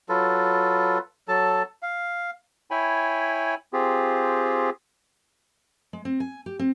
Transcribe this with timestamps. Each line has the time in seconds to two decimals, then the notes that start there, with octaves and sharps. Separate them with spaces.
0.09 F#3 F4 A4 B4
1.28 F#3 A4 A5
1.82 F5
2.71 E4 C#5 G5 G#5 B5
3.73 C4 F4 G4 G#4
5.93 G#3
6.05 C4
6.20 G#5
6.46 G4
6.59 C4